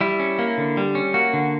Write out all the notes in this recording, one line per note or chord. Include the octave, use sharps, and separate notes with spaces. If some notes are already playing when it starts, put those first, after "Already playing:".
G3 E4
C#4
A#3
D3
G3
C#4
A#3 F#4
D3